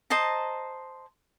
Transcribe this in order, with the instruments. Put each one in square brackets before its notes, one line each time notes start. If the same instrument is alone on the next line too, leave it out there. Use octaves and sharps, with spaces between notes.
[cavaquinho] C5 D#5 A5 A#5